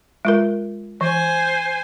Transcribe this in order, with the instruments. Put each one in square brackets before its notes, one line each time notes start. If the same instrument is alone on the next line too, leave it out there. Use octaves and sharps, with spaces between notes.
[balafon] G#3 F4 A#4
[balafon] E3 [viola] C5 G#5